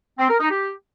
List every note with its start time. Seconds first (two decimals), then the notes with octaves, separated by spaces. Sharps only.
0.19 C4
0.30 A#4
0.40 D#4
0.51 G4